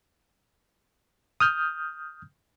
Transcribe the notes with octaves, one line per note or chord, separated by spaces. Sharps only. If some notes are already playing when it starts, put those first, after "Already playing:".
D#6 F6 G6